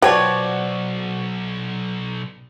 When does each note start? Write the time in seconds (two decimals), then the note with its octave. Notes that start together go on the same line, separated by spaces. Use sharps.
0.02 B1 G2 F3 F#4 B4 C#5 D5 G5